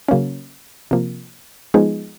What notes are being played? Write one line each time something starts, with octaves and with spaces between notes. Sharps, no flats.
C#3 F#3 A#3 C#4
C3 F3 A#3
F3 G#3 B3 D#4 G#4